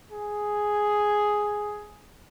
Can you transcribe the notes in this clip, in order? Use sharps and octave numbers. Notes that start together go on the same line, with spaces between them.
G#4